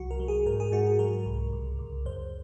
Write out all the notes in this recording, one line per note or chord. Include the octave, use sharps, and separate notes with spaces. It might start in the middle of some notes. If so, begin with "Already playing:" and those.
Already playing: C2 F#3 F#4
A#4
F#3
G#4
G#2 A#4
G#4
G#2 F#4
G#4
F#3 A#4
C2
C#2
C#2
F#2 C5